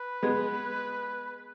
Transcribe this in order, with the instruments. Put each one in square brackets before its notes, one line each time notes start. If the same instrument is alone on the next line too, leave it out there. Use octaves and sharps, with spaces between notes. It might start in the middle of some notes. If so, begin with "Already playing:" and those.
Already playing: [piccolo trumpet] B4
[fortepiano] G#3 B3